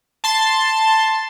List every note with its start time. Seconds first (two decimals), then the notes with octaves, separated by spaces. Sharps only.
0.24 A5 C6 A6